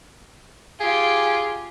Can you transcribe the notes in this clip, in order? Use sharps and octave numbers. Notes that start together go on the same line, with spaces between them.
F4 G4 G#4